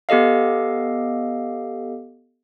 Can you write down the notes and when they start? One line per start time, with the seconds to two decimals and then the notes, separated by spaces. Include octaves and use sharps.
0.09 B3 G4 A4 D#5 F5